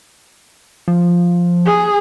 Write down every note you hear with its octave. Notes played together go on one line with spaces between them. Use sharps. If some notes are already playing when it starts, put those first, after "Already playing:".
F3
G#4